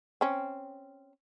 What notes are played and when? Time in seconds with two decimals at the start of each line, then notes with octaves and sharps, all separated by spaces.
0.21 C4 C#4